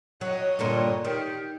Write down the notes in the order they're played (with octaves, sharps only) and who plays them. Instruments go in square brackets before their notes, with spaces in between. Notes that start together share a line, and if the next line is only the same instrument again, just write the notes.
[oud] F#3 [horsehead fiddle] C#5 D#5
[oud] G2 A#2 D3
[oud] D#3 [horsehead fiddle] G4